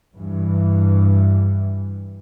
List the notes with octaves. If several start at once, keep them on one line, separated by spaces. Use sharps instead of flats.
G2 E3